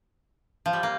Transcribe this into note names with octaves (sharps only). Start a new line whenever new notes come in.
F3
G3
A#3